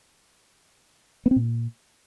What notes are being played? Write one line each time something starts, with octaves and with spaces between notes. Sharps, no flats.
B3
C4
A#2